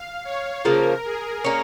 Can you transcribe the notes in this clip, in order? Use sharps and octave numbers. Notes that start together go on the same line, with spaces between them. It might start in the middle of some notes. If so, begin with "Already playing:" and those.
Already playing: F5
C#5
C#3 F3 A#3 A#4
G#4
A#3 C#4